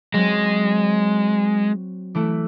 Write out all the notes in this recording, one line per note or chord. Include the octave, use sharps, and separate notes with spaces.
F#3 G#3 C4
E3 A3 E4